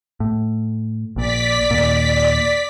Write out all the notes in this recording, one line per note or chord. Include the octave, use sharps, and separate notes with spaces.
A2
A#1 A#2 D5 B6
D#2 A#2